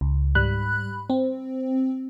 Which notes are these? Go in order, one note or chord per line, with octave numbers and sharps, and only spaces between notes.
C#2
G#2 G3 B5 F#6
C4